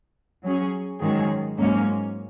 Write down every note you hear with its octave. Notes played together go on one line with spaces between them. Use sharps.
F#3 C#4 G#4
G#2 D#3 F#3 C#4 G#4
G#2 F#3 A#3 C#4